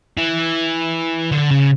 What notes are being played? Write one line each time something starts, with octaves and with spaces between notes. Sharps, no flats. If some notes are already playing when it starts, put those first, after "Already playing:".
E3
D3
C#3